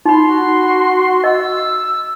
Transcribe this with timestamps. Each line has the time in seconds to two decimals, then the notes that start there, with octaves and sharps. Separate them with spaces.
0.05 D#4 B5 C6
0.26 F#4
1.24 D#5 E6